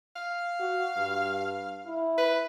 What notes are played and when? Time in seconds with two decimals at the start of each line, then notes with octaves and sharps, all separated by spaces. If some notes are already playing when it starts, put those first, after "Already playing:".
0.16 F5
0.61 F#4
0.97 G2
1.87 E4
2.18 B4